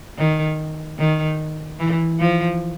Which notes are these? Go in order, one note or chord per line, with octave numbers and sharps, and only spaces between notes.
D#3
D#3
E3
F3